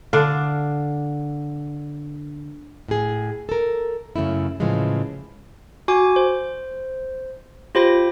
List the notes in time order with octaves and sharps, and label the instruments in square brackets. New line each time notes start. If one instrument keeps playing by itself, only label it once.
[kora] D3 D4 F5
[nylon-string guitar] A2 G#4
A4 A#4
F#2 C#3 A3 E4
A2 C#3 E3 F3 G#3
[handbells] F#4 G#5 D6
C5
F4 G4 C5 B5 A#6